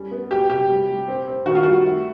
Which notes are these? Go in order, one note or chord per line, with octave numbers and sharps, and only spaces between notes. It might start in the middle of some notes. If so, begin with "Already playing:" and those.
Already playing: G3 C#4
B3
F#3 G4
C3 G4
G3
G3
C4
C4
D#3 F#4
F4
G3 F#4
A3